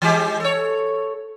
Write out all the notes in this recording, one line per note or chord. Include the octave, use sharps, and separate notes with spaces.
E3 G#3 G4
A4 C#5